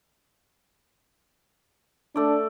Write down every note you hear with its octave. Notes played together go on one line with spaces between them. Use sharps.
A3 D4 D5